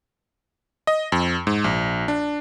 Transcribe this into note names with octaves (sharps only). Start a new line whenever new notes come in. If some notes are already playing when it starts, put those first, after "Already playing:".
D#5
F2
G#2
A#1
D4